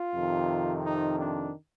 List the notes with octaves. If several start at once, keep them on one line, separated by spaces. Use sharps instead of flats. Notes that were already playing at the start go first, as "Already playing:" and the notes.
Already playing: F4
F2 C3 D#3
D#4
D4